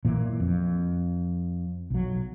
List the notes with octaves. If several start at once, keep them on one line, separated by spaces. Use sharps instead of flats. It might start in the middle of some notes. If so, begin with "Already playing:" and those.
B1 A#2 E3 A#3
F2
B1 F#3